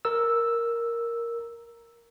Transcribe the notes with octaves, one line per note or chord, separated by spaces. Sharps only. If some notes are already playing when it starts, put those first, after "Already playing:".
A#4 E6